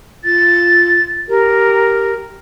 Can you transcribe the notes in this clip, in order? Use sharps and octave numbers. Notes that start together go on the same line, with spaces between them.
F4 A6
G4 A#4